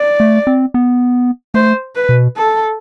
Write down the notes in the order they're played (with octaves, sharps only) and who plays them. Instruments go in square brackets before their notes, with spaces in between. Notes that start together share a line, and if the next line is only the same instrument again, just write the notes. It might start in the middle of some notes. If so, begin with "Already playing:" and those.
Already playing: [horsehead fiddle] D5
[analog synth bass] A3
C4
B3
[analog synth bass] A3 [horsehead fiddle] C5
[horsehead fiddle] B4
[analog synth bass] B2
[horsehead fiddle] A4